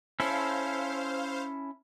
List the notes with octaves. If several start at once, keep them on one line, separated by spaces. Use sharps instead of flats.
C#4 E4 A4 C5 F5